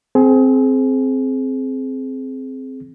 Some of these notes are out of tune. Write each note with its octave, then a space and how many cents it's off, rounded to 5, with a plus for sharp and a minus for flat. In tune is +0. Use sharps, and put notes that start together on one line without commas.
C4 +0 G#4 +30